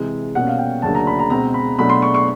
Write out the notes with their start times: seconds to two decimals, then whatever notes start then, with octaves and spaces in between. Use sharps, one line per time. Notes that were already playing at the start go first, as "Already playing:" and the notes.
Already playing: C3 E3 G#3
0.35 B2 G3 A#3 C#4 F#5
0.47 F5
0.58 G5
0.82 D2 C#3 F#3 A#3 D4 A5
0.95 A#5
1.07 B5
1.19 A#5
1.30 B2 G#3 C4 A#5
1.54 B5
1.78 B2 F#3 A3 D4 B5
1.89 C6
2.02 C#6
2.14 C#6